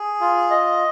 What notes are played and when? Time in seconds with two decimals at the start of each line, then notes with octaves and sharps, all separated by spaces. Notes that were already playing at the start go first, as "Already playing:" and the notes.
Already playing: G#4
0.21 F4
0.51 D#5